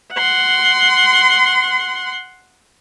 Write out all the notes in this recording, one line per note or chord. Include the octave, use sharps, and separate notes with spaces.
F#5 C6